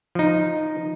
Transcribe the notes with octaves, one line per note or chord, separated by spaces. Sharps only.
F3 D#4